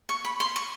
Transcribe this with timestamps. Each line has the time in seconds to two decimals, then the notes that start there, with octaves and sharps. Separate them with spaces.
0.09 C#6
0.25 B5
0.40 C6
0.56 C#6